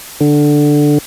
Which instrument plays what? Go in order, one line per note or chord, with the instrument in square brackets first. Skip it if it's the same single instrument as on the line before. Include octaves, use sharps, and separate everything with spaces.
[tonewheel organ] D3